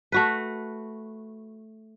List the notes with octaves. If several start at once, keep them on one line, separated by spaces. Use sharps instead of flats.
A3 F#4 B4